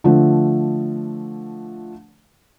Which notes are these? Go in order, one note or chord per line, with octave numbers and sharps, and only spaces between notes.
D3 F3 A3